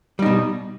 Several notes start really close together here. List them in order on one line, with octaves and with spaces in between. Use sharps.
G3 D#4 B2